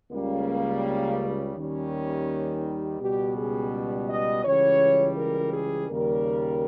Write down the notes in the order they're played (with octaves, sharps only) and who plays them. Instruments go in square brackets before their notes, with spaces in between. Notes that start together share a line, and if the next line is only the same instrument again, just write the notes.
[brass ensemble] C#2 C#3 G3 A#3
D#2 D#3 G3 C#4
C#2 B2 G3 G4
G#4
D#5
C#2 C#3 E3 G3 C#5
A#4
G#4
D#2 C#3 G3 A#4